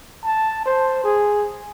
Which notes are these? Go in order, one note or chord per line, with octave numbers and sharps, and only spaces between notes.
A5
C5
G#4